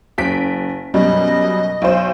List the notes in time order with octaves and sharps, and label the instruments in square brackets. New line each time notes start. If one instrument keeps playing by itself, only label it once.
[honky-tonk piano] F#1 B6 D7
[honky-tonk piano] F#2 B2 G3 [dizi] D#5
[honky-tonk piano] B1 C5